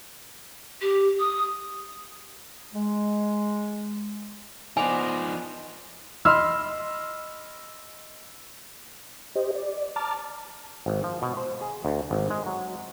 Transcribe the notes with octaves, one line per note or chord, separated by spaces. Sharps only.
G4
D#6
G#3
F3 B3 D#4 C5 D5 G#5 A#5
D#5 B5 C6 E6 F6
G4 C5 D#5
D5
A5 A#5 D6 F6 A6
G#1
F3
B2
C5
G#4
D2
G#1
G#3
F#3